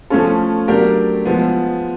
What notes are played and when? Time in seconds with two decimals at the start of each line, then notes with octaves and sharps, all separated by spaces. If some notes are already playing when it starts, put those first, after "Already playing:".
0.10 F3 A3 C#4 F4 A4
0.68 F#3 A3 D4 G4 A#4
1.25 F3 G#3 B3